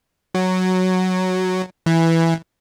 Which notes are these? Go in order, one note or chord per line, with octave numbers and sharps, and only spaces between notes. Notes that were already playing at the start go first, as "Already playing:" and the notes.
F#3
E3